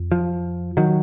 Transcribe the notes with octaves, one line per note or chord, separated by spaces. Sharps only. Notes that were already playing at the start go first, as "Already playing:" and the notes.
Already playing: F2
F3
D#3 F#3